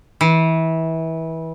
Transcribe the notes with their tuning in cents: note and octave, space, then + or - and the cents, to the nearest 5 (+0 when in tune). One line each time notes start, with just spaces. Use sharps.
E3 -25